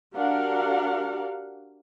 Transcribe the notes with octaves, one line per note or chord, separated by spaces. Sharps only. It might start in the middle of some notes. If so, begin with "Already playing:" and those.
D4 F#4 G4 A#4 F5 F#5